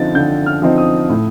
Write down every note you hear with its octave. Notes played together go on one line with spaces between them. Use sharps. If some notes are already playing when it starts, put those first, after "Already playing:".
Already playing: D3 F3 C4 D#4 A6
D3 G6
F6
F3 C4 D#4
D#6
A2